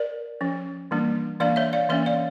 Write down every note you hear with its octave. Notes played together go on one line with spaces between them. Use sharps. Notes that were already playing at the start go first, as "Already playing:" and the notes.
Already playing: A#4 D5
F3 C#4
E3 G3 A#3 D4
E3 A#3 D4 D5 F5
C#5 E5
D5 F5
E3 A#3 C#4 C#5 E5
D5 F5